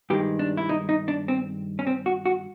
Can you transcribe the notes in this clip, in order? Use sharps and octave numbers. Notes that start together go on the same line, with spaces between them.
G2 D#3 G#3 G4
D4
E4
D#4
D#4
D4
C4
C#4
C4
F#4
F#4